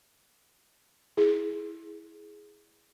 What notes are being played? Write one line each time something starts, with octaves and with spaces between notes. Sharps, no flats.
E4 G#4